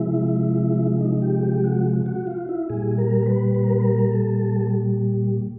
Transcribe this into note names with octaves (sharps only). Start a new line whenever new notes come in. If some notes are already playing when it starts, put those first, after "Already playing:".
Already playing: C3 F3 G#3 E4
D#4
G4
G4
F#4
F#4
F4
E4
A#2 G3 G#4
A#4
B4
B4
A#4
B4
A#4
A4
A4
A4